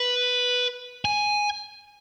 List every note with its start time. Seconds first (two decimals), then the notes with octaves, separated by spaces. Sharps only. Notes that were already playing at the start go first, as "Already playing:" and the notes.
Already playing: B4
1.05 G#5